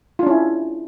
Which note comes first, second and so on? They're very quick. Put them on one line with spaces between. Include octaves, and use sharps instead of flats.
F4 D4 C#4 E4